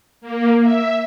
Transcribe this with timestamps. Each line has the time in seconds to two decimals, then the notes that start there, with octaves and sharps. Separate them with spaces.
0.21 A#3
0.62 E5